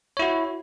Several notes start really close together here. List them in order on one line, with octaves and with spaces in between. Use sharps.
C#5 E4 F#4